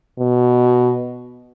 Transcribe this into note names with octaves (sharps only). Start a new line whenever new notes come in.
B2